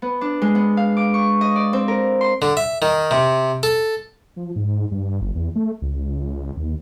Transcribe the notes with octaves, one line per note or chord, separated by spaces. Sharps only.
B3
D4
G#3
B3
F5
D6
C#6
D#5
D5
C4
A#4
C6
D3
E5
D#3
C3
A4
F3
G#2
G2
G1
E2
A3
C#2
D#2